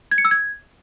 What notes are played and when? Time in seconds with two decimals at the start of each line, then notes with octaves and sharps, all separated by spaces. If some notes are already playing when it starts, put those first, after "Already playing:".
0.11 G#6
0.18 C#7
0.25 E6
0.31 G#6